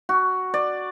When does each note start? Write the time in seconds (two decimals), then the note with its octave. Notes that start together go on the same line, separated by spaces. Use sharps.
0.09 F#4
0.54 D5